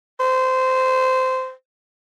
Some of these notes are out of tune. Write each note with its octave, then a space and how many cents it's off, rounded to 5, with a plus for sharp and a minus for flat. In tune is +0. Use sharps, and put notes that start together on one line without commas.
C5 -15